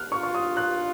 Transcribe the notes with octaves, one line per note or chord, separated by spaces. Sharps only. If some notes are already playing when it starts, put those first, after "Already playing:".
Already playing: F6 F#6
F4 C#6
C#6
D#6
F#6